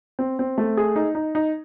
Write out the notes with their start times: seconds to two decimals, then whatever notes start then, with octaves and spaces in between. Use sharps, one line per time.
0.19 C4
0.39 C4
0.58 A3
0.77 G#4
0.96 D#4
1.15 D#4
1.35 D#4